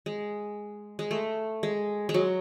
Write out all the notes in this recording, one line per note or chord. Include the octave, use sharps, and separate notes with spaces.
G#3
G#3
A3
G#3
G#3
F#3